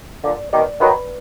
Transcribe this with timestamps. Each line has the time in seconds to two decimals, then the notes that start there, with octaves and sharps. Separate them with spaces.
0.24 A#2 D3 D5
0.52 B2 D#3 D5
0.80 D#3 F#3 B4